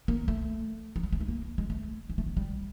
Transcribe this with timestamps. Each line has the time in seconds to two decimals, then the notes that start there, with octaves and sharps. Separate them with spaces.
0.08 A#3
0.28 A3
0.96 F#3
1.03 G3
1.13 G#3
1.20 A3
1.28 A#3
1.58 G#3
1.70 A3
2.10 G#3
2.18 A3
2.26 G#3
2.37 G3